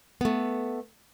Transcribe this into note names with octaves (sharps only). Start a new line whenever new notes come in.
A3 B3